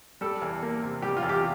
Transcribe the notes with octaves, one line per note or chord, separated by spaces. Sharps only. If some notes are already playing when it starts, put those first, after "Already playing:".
G3 A4
E2
A#3
C3
G3 G4
F4
E2
G4